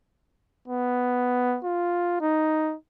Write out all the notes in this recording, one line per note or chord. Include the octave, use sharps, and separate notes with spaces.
B3
F4
D#4